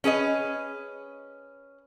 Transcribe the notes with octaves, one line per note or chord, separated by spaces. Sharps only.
C#4 G#4 B4 D#5